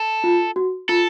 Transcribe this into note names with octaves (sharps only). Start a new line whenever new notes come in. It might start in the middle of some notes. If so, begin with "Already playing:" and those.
Already playing: A4
F4
F#4
F4 A4